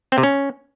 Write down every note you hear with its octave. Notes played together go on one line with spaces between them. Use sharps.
C4
C3
C#4